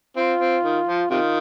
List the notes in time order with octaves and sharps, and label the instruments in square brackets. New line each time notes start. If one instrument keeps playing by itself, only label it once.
[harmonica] C4 [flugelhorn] F4
[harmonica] C4
D#3
F3
[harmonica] C3 D#3 [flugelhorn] F4